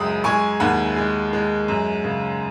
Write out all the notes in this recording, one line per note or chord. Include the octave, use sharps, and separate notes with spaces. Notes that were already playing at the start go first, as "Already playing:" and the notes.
Already playing: C#2 F#2 G#3 B5 D#6
G#3 G#5 C#6
D#2 F#5 B5
G#3
G#3
F#2
C#3